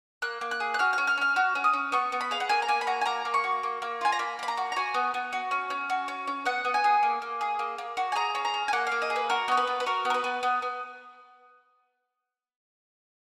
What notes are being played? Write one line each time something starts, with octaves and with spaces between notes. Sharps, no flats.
A#3 F#6
A#3
F#6
G#4
F#6
F#4 F6
C#4 F6
F6
C#4 F6
F#4 F6
C#4
D#6
C#4
B3 C#6
B3
B5
G#4 F5
F#5
A#3 G#5
A#5
A#3 G#5
B5
F#4 A#5
G#5
A#3 A#5
A#3
C#6
F#4
A#3
A#3
F4 G#5
A#5
A#3 B5
A#3 B5
A#5
F#4
A#5
F#4 G#5
B3
B3
F#4
C#4
C#4
F#4
C#4
C#4
B3 F#5
B3
G#5
G#4
A#3
A#3
G#4
A#3
A#3
F#4
G#5
G#4 A#5
C#4
A#5
C#4
G#5
A#3 F#5
A#3 F5
D#5
G#4
B4
F#4 A#4
B3 C#5
B4
B3
B4
F#4 A#4
B3
A#4
B4
B3
B3
B3